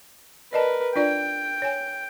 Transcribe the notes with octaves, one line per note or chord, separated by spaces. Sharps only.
A#4 B4 D5 D#5 A5
D4 F4 D5 G5
C#5 G#5